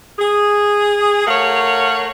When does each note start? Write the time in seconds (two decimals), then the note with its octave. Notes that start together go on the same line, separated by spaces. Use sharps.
0.19 G#4
1.26 A3 A#4 C#5 F5 F#5